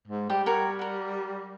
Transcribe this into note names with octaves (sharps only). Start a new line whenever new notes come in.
G#2
G3 G4
F#4 A#4 C#5
F#4 A#4